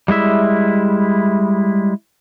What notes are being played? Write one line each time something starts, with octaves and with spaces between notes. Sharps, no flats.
G3 G#3 E4 E5